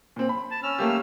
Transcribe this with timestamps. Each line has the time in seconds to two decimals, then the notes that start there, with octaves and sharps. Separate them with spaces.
0.16 A#2 C4
0.29 B5
0.51 A5
0.63 C#4 E6 F6
0.79 A3 A#3 G4